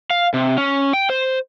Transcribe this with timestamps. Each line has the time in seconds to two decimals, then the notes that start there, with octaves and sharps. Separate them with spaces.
0.10 F5
0.34 C3
0.58 C#4
0.93 G5
1.10 C5